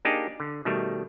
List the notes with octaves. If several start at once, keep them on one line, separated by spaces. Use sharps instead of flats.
A#3 D4 D#4 G4 G#4
D3
B2 D#3 G3 A3